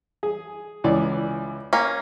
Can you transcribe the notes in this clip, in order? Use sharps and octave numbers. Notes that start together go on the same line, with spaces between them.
G#4
C#2 E3 D5
A#3 C#4